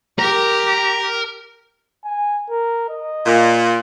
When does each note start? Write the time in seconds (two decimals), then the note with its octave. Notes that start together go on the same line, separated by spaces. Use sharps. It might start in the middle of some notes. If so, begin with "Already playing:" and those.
0.19 G4 A#4
2.05 G#5
2.50 A#4
2.89 D#5
3.25 A#2